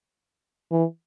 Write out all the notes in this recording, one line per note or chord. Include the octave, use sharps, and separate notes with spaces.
E3